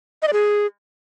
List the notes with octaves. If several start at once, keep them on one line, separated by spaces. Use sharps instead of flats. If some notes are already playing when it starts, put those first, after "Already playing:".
D#5
D5
G#4